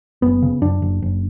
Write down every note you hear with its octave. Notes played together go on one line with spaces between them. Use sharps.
F#1 B3
C#3
F#2 D4
F#1
F#1